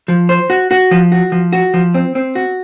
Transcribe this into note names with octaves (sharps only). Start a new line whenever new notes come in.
F3
C5
F#4
F#4
F3
F#4
F3
F#4
F3
C4
C4
F#4